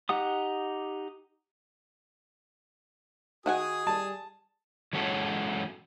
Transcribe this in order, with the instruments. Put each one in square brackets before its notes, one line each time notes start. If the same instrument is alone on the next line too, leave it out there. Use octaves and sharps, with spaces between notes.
[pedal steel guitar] D#4 G4 F#5 D#6
[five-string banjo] D#3 F#5 G#5 [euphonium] F#4 [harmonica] G#4 D#6
[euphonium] G3 [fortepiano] A5
[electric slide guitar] E3 G#3 C#4 F#4 A4 C#5